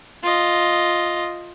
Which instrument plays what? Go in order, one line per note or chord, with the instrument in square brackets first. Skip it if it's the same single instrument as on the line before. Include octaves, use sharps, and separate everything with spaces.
[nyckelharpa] F4 D#5